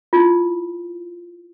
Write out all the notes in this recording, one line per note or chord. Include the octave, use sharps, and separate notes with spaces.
E4 F4